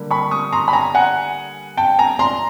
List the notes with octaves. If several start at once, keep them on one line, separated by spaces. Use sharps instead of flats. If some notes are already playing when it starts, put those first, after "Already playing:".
Already playing: D3 G3 A#3
B5 C#6
C#6 D#6
A#5 C6
B5
G#5 A#5
F#5 G#5
G5 A5
G#5 A#5
A#5 C6